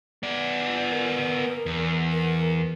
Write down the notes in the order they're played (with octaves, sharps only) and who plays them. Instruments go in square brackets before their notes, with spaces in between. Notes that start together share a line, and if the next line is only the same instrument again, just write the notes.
[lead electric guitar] B3 D5
[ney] A#4
[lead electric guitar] E2
[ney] A#4